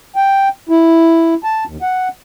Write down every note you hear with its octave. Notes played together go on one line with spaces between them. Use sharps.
G5
E4
A5
D#2
F#5